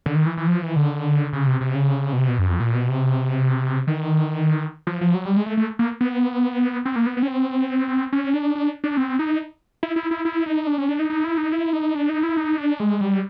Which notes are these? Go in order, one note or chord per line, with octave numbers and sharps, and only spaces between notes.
D3
D#3
E3
E3
F3
E3
D3
C#3
C3
C3
C#3
B2
C3
B2
F#2
F2
A#2
B2
C3
D#3
F3
F3
F#3
G3
G#3
A3
A3
A#3
B3
C4
A#3
B3
B3
C#4
C4
C#4
D4
D4
D4
C4
D#4
E4
E4
E4
E4
D#4
D4
C#4
D4
D#4
D#4
E4
D#4
E4
D#4
D4
D#4
E4
D#4
D4
G#3
G3